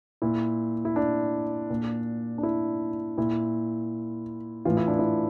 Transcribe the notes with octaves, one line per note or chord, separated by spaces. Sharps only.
A#2 E4
E4
D4
A#2
D4
E4
A#2 E4
A2 E3 F4
E4
D4
E4